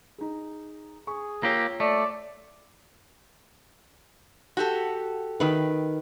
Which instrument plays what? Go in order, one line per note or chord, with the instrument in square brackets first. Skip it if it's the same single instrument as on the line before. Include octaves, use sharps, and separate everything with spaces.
[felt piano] D#4 G#4
[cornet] G#4 [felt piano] C#6
[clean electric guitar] A#3 G4 [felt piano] F4 C#5 E6
[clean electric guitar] A3 [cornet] D5
[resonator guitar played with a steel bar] F#4 G4 A4
[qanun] D#3 B4